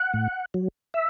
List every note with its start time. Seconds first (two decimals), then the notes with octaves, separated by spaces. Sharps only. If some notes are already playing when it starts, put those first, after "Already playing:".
Already playing: F#5
0.14 A2
0.54 F#3
0.94 E5